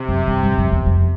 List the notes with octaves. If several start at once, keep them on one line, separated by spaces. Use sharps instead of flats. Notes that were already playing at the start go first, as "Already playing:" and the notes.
Already playing: C3
F#2
G2
G2
F#2
E2
F2